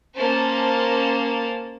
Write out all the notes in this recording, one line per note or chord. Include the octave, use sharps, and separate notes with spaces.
A#3 C#4 C5 A5